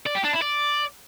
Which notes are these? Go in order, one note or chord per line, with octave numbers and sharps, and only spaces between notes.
D5
G4
D4
E4
D5